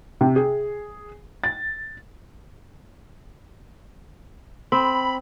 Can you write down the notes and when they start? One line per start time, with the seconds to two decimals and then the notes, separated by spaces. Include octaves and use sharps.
0.21 C3
0.36 G#4
1.44 A6
4.72 C4 B5